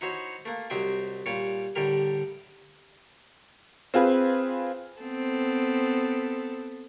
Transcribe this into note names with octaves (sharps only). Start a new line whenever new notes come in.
D#4 E4 F#4 C5 C#5
A3 A#3
C2 F#3 C5 D#5 E5 G5
A#2 G3 C#5 D6
A2 D3 G3 G4 A#4
C4 F4 G#4 B4
B3 C4 A4